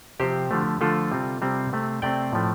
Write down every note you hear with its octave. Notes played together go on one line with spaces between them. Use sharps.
C3 F3 C4 G4 C5
D3 F3 A3
D3 F3 A3 F4 A4
C3 G3 C4
C3 G3 C4
C3 A3 C4
C3 A3 C4 D5 G5
A2 F3 A3